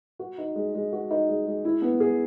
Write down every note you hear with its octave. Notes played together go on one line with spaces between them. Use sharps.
F#4
D#4
G#3
G#3
F#4
D#4
G#3
G#3
E4
B3
G#4